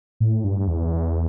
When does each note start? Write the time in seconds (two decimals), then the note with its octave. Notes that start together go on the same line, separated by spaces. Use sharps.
0.20 A2
0.44 G2
0.68 E2